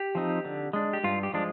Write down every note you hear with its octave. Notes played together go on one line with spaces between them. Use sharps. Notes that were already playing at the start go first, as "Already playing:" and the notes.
Already playing: G4
F3 C4 D#4
D3
G#3 D4
G4
G2 F4
G4
F3 G#3 D4